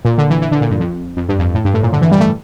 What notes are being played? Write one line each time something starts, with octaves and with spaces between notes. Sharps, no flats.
A#2
D3
E3
E3
D3
A#2
G2
F2
F2
G2
F2
A2
G2
A2
A#2
D3
E3
G3
A3